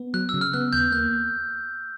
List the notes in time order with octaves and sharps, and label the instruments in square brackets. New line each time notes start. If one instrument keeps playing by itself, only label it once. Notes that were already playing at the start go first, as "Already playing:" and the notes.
Already playing: [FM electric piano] B3
[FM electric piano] F#3 [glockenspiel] F#6
[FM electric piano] C#3 [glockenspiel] E6
[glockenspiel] F6
[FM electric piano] B3 [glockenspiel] F#6
[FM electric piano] D#2 [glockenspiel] G6
[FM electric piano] A#3 [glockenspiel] F#6